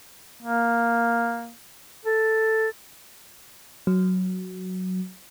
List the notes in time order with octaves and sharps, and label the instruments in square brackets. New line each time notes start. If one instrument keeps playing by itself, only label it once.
[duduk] A#3
A4
[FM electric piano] F#3